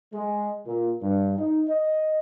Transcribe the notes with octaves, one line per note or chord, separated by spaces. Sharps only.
G#3
A#2
G2
D#4
D#5